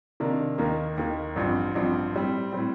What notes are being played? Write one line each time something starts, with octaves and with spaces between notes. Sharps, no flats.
C3 D#3 A#3 D4
D#2 D#3 A#3
D#2 D#3 A#3
A1 G2 F3 C4
A1 G2 F3 C4
A2 G3 C4
A2 G3 C4